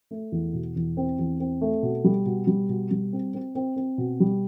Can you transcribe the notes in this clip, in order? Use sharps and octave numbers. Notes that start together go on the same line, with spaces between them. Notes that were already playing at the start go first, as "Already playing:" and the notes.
A3
E2
B2
E2
C4
E2
C4
A3
B2
G3
B2
G3
B2
G3
C4
C4
C4
C4
B2
G3